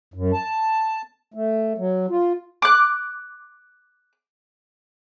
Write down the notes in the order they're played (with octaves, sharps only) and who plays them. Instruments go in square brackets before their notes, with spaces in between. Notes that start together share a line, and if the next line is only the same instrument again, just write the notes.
[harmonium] F#2
A5
A3
F#3
F4
[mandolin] D6 F#6